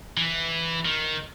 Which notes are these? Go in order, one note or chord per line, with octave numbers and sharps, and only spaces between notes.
E3
D#3